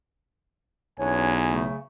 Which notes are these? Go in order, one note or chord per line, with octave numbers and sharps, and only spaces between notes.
B1 E2 C#4 D4 C#5 G#5
C#3 F#3 A3